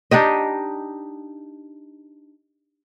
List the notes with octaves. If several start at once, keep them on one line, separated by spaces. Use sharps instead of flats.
D4 D#4 G4 D#5